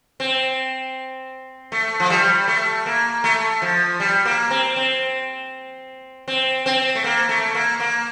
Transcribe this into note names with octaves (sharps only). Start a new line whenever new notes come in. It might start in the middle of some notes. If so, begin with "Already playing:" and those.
C4
A3
F3
G3
A3
A#3
A3
F3
G3
A#3
C4
C4
C4
C4
A3
A#3
A3
A#3
A#3